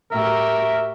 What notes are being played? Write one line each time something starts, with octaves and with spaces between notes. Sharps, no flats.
A2 F#4 G4 A#4 E5